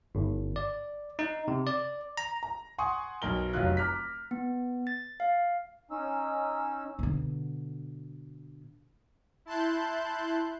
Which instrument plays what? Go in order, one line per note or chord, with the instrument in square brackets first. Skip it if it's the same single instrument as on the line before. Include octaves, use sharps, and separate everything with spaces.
[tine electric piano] G1
D5
D#4
C3
D5
A#5
[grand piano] A#5
F#5 G#5 C6 C#6 D#6
B1 A#4 G7
F1 F#3 F4 F#6
A#5 D6 F6 F#6 B6
[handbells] B3
A6
F5
[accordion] C#4 D#4 E6
[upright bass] B2 D3
[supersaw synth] E4 A5 C6 F#6 G6